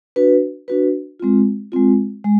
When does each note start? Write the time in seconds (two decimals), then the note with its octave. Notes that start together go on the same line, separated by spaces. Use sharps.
0.16 D4 F#4 B4
0.68 D4 F#4 B4
1.20 G#3 C4 F4
1.72 G#3 C4 F4
2.24 G#3